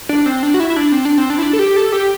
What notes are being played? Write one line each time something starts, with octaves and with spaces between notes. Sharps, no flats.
D4
C4
D4
F#4
E4
E4
D4
C4
D4
C4
D4
E4
D4
A4
G4
A4
G4